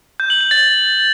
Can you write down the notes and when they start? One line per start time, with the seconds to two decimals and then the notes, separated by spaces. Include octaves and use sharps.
0.20 G6
0.30 F#7
0.41 F#7
0.51 A6